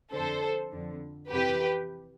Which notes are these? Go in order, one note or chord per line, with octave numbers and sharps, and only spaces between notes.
F2 D3 A4 C5
F2 D3
F2 C3 E3 G4 B4